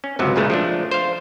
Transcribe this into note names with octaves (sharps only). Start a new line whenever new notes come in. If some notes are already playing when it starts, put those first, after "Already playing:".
C#4
G1 C#2 C3 F#3
C#2 A#2 C#3 G#3 A3
F3 A3 D4
C5 F5